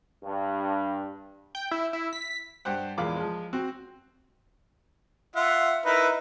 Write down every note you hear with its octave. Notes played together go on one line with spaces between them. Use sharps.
G2
G5
E4
E4
B6
G2 G4 C5 F#5
E2 A#2 G#3 F5 B5 D6
F3 G#3
C4 F#4
F4 E5 F#5
D#4 E4 A#4 B4